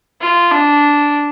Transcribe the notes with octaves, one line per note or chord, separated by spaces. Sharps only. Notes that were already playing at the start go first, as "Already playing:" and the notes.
F4
D4